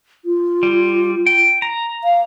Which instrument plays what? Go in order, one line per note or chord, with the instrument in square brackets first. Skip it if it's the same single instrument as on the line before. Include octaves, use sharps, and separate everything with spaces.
[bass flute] F4
[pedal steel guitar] G3
G5
A#5
[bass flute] F5